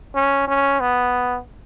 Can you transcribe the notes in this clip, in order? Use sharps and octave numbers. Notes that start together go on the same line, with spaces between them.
C#4
C#4
B3